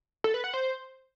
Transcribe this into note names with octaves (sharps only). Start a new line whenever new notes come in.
A4
B4
F#5
C5